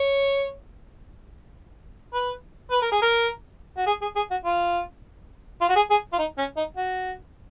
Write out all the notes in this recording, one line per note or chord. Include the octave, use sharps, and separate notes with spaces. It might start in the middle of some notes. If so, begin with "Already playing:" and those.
Already playing: C#5
B4
B4
A#4
G#4
A#4
F#4
G#4
G#4
G#4
F#4
F4
F4
F#4
G#4
G#4
F4
D#4
C#4
D#4
F#4